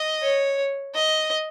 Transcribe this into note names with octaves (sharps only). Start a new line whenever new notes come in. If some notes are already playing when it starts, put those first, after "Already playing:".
Already playing: D#5
C#5
D#5